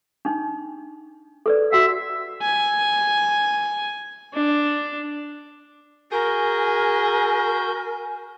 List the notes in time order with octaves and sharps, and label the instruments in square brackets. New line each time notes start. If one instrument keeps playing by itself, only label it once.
[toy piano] D4 D#4
A4 B4 D5
[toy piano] F#4 F#5 [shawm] E5
[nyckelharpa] G#5
D4
[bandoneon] F#4 G6 [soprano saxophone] G#4 [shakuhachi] A#4 [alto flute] G#5